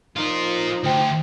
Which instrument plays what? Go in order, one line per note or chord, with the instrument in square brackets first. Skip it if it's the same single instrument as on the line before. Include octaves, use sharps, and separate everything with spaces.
[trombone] F3 [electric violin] D#4 [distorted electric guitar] F4 A#4
[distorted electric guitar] D2 [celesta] C5 G5